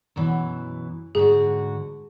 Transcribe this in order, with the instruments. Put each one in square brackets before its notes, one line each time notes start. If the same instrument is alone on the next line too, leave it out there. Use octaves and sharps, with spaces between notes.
[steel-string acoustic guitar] F#2 B2 E3
[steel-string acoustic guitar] G#2 D3 F#4 [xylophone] G#4